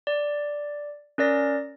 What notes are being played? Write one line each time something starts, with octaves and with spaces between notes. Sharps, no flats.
D5
C#4 A#4 D5 A#6